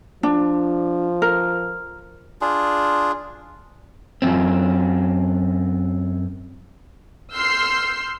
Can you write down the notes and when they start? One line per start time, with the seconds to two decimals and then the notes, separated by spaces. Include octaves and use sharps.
0.23 F3 D4
1.22 A#4
2.41 D4 F4 G#4
4.22 F#2 C4
7.33 C6 E6 F6 G6 C7